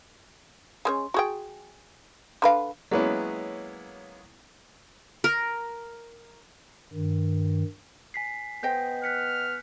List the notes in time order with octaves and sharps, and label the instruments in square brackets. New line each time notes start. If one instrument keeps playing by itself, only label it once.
[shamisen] G#3 A3 C#4
F#4 G#4 G5
D3 B4 F5
[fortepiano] F#3 G#3 A#3 B3 C#4 E4
[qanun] A#4
[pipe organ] G2 D#3
[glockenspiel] G#5 B6 C7
[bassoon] B3 [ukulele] C5 D#5 G5 [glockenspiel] G6
[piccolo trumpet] F6 [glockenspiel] F#6 B6 C#7